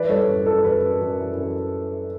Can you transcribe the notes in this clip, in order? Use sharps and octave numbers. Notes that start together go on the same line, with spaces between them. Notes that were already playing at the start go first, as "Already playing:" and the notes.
Already playing: E3 B4 D5
G3 A4 C#5
F#2
F#2 A4
F#2 B4
F#2
F#2
E3
F#2